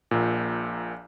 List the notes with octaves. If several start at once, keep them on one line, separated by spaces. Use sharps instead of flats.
A#1 A#2